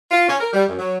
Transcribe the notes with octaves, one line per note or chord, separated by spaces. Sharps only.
F4
C#4
A#4
G3
F#2
F#3